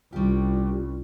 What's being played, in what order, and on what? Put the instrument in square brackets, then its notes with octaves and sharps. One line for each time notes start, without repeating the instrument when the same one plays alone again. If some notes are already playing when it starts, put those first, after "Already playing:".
[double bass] C2 [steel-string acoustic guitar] G3 G4 [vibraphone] C#4 F4